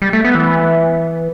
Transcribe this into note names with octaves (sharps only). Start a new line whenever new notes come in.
G3
A3
B3
E3